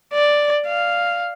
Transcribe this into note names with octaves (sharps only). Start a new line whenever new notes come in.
D5
F5